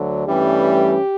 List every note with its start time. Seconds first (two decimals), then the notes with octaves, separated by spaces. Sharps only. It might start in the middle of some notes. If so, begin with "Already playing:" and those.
Already playing: D2 D3 F#3
0.27 G2 E3 G3 A3 C#4 G4